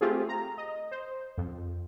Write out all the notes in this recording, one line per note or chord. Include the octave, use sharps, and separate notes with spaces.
A3 C4 F4 G4 G#4
A#5
D#5
C5
F2